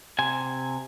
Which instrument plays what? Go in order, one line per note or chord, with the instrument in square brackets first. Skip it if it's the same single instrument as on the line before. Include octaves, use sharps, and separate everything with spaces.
[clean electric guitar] C3 G#5